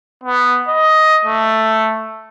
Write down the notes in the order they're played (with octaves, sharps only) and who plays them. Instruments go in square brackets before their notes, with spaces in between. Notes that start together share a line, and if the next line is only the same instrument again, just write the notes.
[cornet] B3
D#5
A3